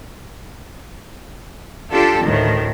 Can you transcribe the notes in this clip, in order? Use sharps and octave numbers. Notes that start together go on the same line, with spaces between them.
D4 F4 G4 A4
D2 A2 D#3